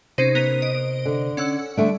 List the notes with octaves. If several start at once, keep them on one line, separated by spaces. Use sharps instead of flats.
C3 C#4 D#4 C5 C7
B3 A#4 D#7
D#5 D7
D3
C#4 F#5 E6
D3 G3 A3 D7